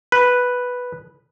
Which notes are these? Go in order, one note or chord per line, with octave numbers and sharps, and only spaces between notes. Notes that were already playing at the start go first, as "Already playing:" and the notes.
B4